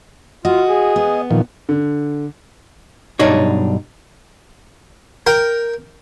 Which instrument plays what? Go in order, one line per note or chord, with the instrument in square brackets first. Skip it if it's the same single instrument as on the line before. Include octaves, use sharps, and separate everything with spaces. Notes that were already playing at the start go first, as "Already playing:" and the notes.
[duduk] F4 [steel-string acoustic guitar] F#4 [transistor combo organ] D#5
[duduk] G#4
[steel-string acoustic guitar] B3
[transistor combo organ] A#2 D#3 F3
[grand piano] D3
[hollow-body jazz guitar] B1 G2 D4 D#4 C#5
[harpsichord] A#4 G5